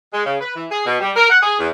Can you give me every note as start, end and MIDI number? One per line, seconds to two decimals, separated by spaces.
0.14 0.24 56
0.26 0.37 49
0.41 0.53 71
0.55 0.66 52
0.71 0.83 68
0.85 0.96 47
1.00 1.11 55
1.16 1.28 70
1.30 1.39 78
1.43 1.58 68
1.59 1.69 40